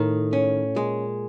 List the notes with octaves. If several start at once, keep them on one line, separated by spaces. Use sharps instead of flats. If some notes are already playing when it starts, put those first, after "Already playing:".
Already playing: A2 D#3
C#4
A#2 G#3